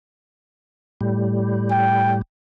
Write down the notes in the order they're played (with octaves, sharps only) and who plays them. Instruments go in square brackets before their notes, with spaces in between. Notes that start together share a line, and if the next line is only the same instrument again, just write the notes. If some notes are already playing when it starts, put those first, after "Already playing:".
[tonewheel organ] A2 G3
[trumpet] G5